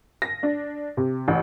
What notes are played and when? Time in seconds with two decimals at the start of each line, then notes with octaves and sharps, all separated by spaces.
0.22 A#6
0.43 D4
0.97 C3
1.28 A1